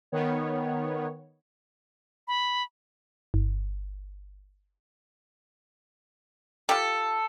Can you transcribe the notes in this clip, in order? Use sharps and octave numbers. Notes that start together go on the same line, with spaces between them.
D#3 B3 C#5
B5
G1
F4 G4 A4